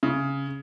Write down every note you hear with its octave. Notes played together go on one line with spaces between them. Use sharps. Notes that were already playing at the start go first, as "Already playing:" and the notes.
C#3